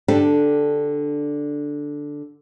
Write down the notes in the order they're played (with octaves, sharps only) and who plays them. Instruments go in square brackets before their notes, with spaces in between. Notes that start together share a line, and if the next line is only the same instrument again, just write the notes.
[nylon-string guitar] D3 D4 G4 A4